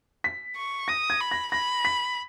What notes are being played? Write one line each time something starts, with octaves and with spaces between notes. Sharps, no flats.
B6
C#6
D#6 A#6
G#6
B5
A#6
B5 A#6
B6